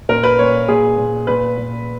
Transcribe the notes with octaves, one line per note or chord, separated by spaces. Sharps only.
A#2 A#4
B4
A#2 C#5
A#2 G#4
A#2
A#2 B4
A#2